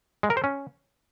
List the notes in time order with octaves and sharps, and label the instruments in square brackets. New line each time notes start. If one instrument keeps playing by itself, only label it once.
[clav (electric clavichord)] G#3
A#4
C5
C#4